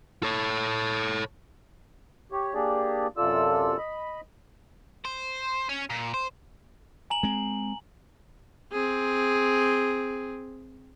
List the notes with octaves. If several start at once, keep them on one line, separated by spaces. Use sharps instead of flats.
A4 C#5
G4 C#5
A#3 D4 G4 G#4 D5
F#2 C3 F4 A4 D5 E6
D#5 B5
C5
C#4
A#2
C5
G#5 A#5 F#7
G#3 C4
C4 G#4